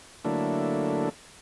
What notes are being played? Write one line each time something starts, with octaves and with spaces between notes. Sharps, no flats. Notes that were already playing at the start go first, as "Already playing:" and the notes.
D3 F#3 A3 A#3 D4 E4